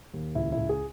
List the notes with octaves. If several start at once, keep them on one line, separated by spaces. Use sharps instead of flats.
D#2
C#2 E4
E4
C#2
G#4